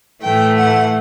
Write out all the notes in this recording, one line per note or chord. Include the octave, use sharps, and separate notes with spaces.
A2 E3 A3 G5
F#5